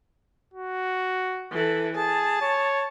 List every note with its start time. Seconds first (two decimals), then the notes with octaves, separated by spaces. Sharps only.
0.54 F#4
1.51 E3 A4
1.95 G#4 A5
2.42 C#5